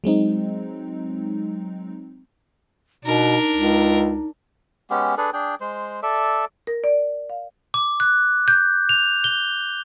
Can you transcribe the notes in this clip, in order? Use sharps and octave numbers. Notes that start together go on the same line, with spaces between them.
F#3 G#3 C4 D#4
B2 D4 D#4 A#4
C#2
G#3 B3 C#4 G4
D4 G#4 A4 B4
D4 G#4 G5
G#3 C5
A4 D5 E5
A#4
D5
F5
D6
F#6
G6
F7
G7